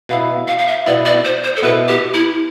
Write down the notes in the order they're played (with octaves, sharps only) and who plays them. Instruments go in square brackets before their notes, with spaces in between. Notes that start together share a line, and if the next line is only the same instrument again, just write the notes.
[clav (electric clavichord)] B2 B3 E4 [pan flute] F5
[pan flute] F5
F5
E5
[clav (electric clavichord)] B2 B3 E4 [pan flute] D5
[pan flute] D5
C5
C5
A4
[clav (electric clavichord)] B2 B3 E4 [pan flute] B4
[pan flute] G4
E4